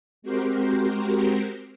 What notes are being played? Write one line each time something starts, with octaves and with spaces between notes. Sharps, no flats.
G#3 C4 F#4 G4 A#4 C5